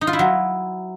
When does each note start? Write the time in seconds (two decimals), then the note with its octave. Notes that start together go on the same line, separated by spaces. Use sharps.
0.01 D#4
0.07 F4
0.13 E4
0.19 F#3